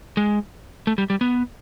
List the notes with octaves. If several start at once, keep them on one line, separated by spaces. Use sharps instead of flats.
G#3
A3
G3
G3
B3